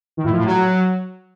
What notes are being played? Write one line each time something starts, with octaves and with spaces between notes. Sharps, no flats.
D#3
A2
F3
A2
F#3